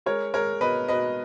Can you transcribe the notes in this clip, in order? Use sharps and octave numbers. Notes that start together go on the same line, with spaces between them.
G#3 A#4 C#5
G#3 A#4 C#5
B2 B4 D#5
B2 B4 D#5